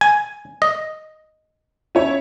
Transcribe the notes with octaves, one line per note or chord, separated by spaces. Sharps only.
G#5
D#5
C#4 E4 C#5